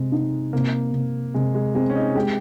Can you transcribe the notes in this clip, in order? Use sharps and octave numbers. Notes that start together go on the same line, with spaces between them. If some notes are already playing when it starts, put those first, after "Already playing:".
Already playing: C3 G#3
D#4
C3 A#3
C3
C3 G#3
G#3
G#3 C4
C#4
D#4
G#3 G4